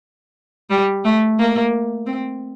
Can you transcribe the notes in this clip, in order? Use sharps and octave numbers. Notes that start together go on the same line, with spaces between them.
G3
A3
A#3
C4